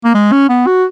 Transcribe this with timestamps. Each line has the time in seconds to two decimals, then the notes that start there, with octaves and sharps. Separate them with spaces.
0.05 A#3
0.15 G#3
0.32 C#4
0.49 B3
0.67 F#4